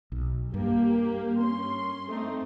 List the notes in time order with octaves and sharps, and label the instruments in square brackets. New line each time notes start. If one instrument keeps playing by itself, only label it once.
[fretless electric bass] B1
[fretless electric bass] G2 [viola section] A#3 G4
[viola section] C#4 C6
A3 C4 D#4